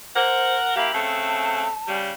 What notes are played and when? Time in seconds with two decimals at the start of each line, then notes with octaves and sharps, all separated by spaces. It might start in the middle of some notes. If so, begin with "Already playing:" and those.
0.15 A#4 C5 F#5
0.75 A#3 E4 G4 F5
0.93 C#3 A3 C4 A5
1.87 C#3 G3